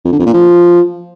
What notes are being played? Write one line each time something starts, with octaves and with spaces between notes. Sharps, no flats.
F2
D3
F2
A#2
F3